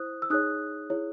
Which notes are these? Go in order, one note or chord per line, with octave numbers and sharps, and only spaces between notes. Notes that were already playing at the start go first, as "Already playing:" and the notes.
Already playing: E4 C5 D#6 F#6
E6
D#4 G#4 C#5 D#6 F#6
E4 G#4 C#5